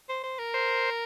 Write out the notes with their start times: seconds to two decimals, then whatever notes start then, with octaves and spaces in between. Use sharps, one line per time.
0.09 C5
0.24 C5
0.39 A#4
0.54 C5